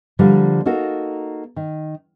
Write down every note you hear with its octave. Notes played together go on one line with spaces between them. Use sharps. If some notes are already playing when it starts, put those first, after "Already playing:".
D3 F3 G3 A#3
A#3 D#4 F#4 A4 A#4
D#3